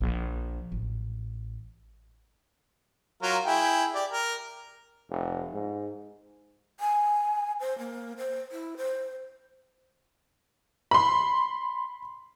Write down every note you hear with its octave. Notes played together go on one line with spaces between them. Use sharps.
A#1
A1
F#3 F4 A#4
E4 G#4 G5
G4 D5
A#4
F1
G#2
G#5
C5
A#3
C5
E4
C5
B5 C6